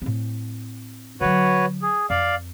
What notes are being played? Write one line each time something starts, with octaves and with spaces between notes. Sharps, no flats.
A2 C4
D3 F#3 F#4 B4 C#5
G#4
F2 D5 F5